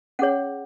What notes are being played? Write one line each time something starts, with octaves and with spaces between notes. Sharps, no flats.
C#4 G#4 C#5 F#5